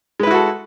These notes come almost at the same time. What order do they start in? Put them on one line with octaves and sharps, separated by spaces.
G#3 B4 E4 F#4 A4